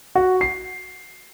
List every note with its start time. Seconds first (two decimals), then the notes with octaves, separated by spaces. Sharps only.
0.15 F#4
0.41 C7